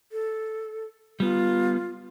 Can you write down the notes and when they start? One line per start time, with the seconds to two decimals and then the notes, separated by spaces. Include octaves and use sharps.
0.12 A4
1.20 G3 B3 F4